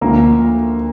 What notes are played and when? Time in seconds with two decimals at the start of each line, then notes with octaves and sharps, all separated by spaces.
0.01 D2 D3 F3 A#3 A#4